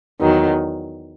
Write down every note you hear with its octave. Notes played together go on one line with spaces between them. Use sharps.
E2 D#3 F#3